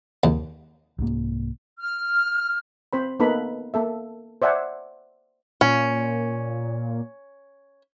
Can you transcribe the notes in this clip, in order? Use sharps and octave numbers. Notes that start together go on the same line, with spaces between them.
D#2
C2 G#2 A#3
F6
C4 C5 B5
A#3 B3 D#4 A4 B4 B5
A#3 A4 E5
C5 D5 E5 F#5 G#5
A#2 C#4